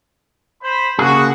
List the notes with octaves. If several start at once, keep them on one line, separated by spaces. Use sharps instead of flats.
C5 B5
C#3 A#3 F#4 G#4